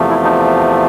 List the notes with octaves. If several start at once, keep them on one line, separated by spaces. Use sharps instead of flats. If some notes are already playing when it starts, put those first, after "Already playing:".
Already playing: E2 C3 F3 A3
E4
D#4